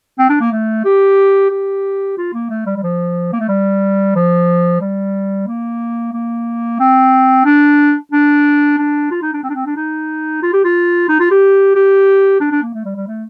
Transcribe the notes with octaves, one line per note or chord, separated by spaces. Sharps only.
C4
D4
A#3
A3
G4
G4
F4
A#3
A3
G3
G3
F3
A#3
A3
G3
F3
G3
A#3
A#3
C4
D4
D4
D4
F4
D#4
D4
C4
D4
C4
D4
D#4
F4
G4
F4
D#4
F4
G4
G4
D4
D4
A#3
A3
G3
G3
A3